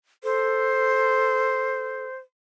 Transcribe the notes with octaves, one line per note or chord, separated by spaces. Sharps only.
A4 C5